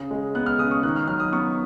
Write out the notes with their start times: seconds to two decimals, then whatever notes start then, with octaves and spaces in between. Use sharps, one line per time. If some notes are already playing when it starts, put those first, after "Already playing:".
Already playing: C#3
0.11 G#3
0.35 B3 F#6
0.46 F6
0.59 C#3 D#6
0.71 C#6
0.83 D#3 F#6
0.96 F6
1.08 F#3 F6
1.20 D#6
1.32 B3 C#6